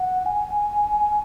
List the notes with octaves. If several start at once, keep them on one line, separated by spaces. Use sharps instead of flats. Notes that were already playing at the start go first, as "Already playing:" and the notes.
Already playing: F#5
G#5